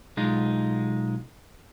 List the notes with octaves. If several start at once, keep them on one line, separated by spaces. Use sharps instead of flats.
B1 G#3 D#4 F4